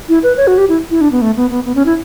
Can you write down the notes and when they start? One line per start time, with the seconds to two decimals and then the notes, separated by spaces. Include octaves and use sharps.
0.09 E4
0.23 B4
0.37 C#5
0.47 F#4
0.58 G4
0.69 E4
0.91 E4
1.01 D4
1.12 B3
1.22 A3
1.37 B3
1.50 B3
1.65 B3
1.75 C#4
1.86 E4